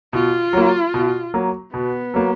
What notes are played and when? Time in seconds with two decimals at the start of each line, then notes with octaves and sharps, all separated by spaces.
0.13 B2 F4
0.53 F#3 A#3
0.94 B2
1.34 F#3 A#3
1.74 B2 B3
2.14 F#3 A#3